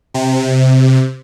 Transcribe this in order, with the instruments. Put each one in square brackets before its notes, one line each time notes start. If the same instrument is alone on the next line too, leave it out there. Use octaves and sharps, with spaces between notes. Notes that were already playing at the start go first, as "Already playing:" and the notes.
[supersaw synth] C3